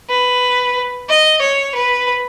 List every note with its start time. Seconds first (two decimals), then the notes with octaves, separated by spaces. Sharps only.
0.10 B4
1.10 D#5
1.42 C#5
1.75 B4